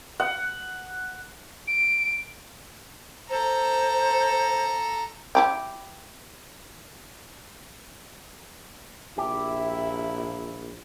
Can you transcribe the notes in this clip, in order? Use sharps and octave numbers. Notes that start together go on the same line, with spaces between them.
F#5
D7
A4 C5 A#5
E4 G4 G5
A#1 E4 G4 E5